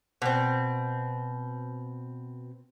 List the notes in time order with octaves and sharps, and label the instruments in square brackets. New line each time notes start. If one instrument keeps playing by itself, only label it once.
[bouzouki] B2 C4